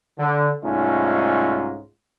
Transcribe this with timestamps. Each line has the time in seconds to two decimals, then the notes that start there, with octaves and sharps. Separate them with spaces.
0.19 D3
0.63 C2 G#2 A3 C#4 D#4 F4